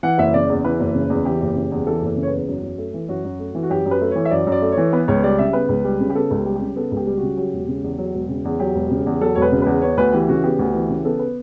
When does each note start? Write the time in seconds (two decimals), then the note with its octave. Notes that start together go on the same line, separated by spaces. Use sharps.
0.03 E3 F#5
0.18 F#1 E5
0.34 C#3 D5
0.49 E2
0.64 E3 B4
0.80 F#1
0.94 C#3
1.10 E2
1.25 E3 G4
1.41 F#1
1.56 C#3
1.71 E2
1.87 E3 A4
2.01 F#1
2.07 A4
2.17 C#3
2.23 C#5
2.27 B4
2.33 E2
2.48 F#2
2.63 F#2
2.78 A3
2.94 E3
3.09 F#2 F#4
3.24 F#2
3.39 A3
3.55 E3
3.63 F#4
3.70 F#2 G4
3.86 F#2
3.91 B4
4.01 A3
4.11 E3 C#5
4.25 E5
4.31 F#2 D5
4.47 F#2
4.52 D5
4.62 A3
4.72 C#5
4.77 E3
4.92 B3 B4
5.08 C#2 C#5
5.23 G3 D5
5.38 C#3 E5
5.53 B3 B4
5.69 C#2
5.84 G3
6.00 C#3
6.10 G4
6.15 B3 A4
6.31 C#2 G4
6.45 G3
6.55 G4
6.61 C#3
6.76 B3 A4
6.92 C#2
6.97 G4
7.07 G3
7.17 F#4
7.22 C#3
7.37 F#3 G4
7.53 E1
7.68 C#3
7.84 E2
7.98 F#3
8.14 E1
8.29 C#3
8.45 E2
8.60 F#3 G4
8.74 E1
8.91 C#3
9.06 E2
9.21 F#3 A4
9.35 E1 C#5
9.42 B4
9.52 C#3
9.62 E2 B4
9.82 B3 C#5
9.97 D2 B4
10.13 E3 G4
10.29 C#3 F#4
10.44 B3 G4
10.59 D2
10.74 E3
10.90 C#3
11.05 B3 A4
11.19 B4